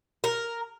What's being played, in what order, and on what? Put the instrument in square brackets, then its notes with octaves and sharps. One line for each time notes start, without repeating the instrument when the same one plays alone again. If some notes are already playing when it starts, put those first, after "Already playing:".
[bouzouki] A#4